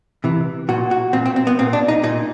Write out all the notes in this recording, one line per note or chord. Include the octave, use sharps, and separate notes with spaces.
C3 E3
A#2 F#4
F#4
A#2 C4
C4
C4
B3
A#2 C4
D4
D#4
A#2 D#4